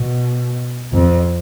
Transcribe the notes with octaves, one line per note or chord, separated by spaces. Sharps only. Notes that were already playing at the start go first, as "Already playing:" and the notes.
Already playing: B2
F2